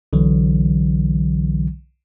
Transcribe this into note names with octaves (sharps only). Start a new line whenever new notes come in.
B1 D3 E3 F#3